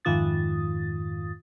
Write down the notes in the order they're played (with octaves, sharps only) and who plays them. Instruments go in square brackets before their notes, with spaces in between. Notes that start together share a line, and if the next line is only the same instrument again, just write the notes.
[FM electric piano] F2 G#2 D#3 F4 D#6 A6